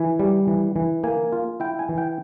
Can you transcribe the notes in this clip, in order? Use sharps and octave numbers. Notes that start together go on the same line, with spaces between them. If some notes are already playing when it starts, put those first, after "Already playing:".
Already playing: E3 G#5
G3
E3
E3
A#3 G#5
F4
E4 G5
G#5
E3
G5